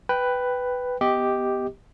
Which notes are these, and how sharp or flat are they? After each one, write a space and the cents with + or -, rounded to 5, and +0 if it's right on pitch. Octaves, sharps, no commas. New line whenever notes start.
B4 +5 G5 +0
B3 +0 G4 +0 D#5 +15